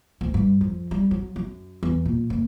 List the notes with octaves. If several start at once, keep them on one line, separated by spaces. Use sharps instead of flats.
D2
G2
F2
G3
F#3
F#2
E2
A#2
F#1